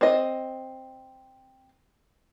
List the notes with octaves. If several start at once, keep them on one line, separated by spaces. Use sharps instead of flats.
C4 D#5